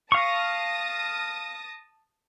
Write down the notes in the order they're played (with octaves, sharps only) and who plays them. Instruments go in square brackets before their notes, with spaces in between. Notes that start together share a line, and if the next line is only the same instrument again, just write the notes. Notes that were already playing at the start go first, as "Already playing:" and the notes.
[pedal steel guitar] F5 C#6 [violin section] A5 D#6 A#6